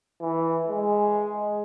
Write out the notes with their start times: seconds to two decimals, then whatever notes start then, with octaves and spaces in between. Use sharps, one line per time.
0.21 E3
0.68 G#3